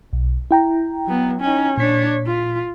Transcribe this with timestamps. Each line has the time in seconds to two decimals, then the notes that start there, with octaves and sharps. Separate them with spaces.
0.13 B1
0.51 E4 G5 A#5
1.06 F#3 B3
1.41 C#4 D#4
1.78 A#2 D4 C#5 B6
2.26 F4